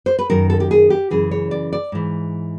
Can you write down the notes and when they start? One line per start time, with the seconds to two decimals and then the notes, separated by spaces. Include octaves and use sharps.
0.06 C5
0.19 B4
0.30 F#2 D#3 A#4
0.50 A4
0.60 G4
0.71 G#4
0.90 G4
1.11 F#2 C#3 E3 G#4
1.31 C#5
1.51 D5
1.73 D5
1.92 G#2 E3